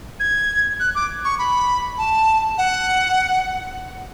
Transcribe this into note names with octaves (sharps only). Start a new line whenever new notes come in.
G#6
F#6
D6
C#6
B5
A5
F#5